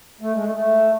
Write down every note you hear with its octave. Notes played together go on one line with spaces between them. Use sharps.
A3
G#3
A3
A3